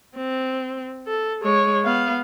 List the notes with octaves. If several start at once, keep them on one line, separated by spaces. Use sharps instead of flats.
C4
A4
G#3 C#5
B3 F5